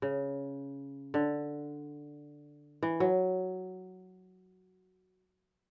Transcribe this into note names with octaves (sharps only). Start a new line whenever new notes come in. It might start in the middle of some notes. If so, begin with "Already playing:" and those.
C#3
D3
E3
F#3